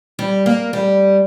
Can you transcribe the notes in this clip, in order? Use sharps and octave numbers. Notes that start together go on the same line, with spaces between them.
G3
A#3
G3